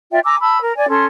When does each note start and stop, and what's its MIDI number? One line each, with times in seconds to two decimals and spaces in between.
0.11 0.19 65
0.11 0.19 74
0.11 0.19 76
0.11 0.19 79
0.24 0.35 80
0.24 0.35 82
0.24 0.35 86
0.24 0.35 88
0.40 0.59 81
0.40 0.59 83
0.40 0.59 88
0.61 0.72 70
0.76 0.89 74
0.76 0.89 80
0.89 1.06 61
0.89 1.06 69
0.89 1.06 84